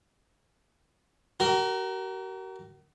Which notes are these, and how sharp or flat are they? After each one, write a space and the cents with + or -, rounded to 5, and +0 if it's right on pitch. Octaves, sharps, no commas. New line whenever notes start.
F#4 +45 A#4 +0